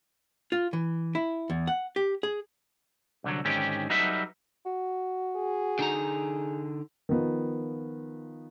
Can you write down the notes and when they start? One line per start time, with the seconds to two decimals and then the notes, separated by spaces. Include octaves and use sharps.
0.52 F4
0.73 E3
1.15 E4
1.50 E2
1.67 F#5
1.96 G4
2.23 G#4
3.24 C2 D3 F#3
3.45 G#2 D3 D#3 C#4 G4
3.90 F#3 G3 D#4 A4 B4 E5
4.66 F#4
5.36 G#4
5.79 D3 D#4 A#5
7.09 D#3 F3 B3